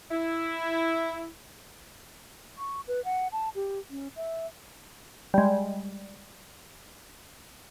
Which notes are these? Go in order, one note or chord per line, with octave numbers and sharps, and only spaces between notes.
E4
C#6
B4
F#5
A5
G4
C#4
E5
G3 G#3